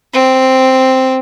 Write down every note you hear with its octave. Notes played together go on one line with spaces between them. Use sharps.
C4